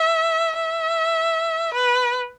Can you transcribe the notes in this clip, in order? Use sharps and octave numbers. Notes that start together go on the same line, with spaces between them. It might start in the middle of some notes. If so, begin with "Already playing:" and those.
Already playing: E5
E5
B4